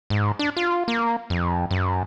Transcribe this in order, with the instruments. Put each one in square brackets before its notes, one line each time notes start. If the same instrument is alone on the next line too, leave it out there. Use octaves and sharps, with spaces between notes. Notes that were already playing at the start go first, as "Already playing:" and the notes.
[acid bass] G#2
D4
F4
A#3
F2
F#2